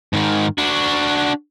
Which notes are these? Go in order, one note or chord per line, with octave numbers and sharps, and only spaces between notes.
G#2 D#3
D4 F#4